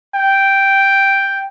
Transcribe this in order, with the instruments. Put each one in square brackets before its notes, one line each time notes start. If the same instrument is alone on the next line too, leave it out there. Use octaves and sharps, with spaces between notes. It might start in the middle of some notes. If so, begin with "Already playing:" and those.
[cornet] G5